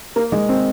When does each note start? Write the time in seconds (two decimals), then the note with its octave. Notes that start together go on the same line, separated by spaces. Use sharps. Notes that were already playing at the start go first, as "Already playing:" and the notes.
0.16 A#3
0.32 G#3
0.49 C4